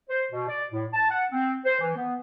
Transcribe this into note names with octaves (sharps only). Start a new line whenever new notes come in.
C5
B2
D5
A2
A5
F#5
C4
C5
E3
B3